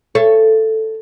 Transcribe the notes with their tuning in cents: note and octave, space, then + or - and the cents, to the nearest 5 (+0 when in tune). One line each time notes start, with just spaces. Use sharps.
A4 +0 C#5 +0 E5 +45